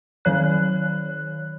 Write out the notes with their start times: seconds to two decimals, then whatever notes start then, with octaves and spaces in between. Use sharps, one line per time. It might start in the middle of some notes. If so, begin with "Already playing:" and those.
0.25 D#3 F#3 C#5 F#6